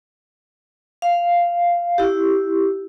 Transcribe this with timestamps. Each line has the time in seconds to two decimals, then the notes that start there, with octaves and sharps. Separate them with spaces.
1.02 F5
1.98 E4 G4